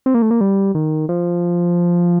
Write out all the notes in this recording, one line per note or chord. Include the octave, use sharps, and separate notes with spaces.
C4
A#3
A3
A#3
G3
D#3
F3